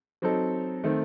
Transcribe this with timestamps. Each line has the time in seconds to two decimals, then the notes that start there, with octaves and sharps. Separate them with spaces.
0.22 F#3 C4 D#4 A4
0.84 D#3 A3 C4